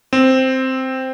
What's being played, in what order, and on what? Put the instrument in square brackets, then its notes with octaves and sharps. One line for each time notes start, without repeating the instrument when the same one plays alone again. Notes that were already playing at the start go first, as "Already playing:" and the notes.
[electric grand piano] C4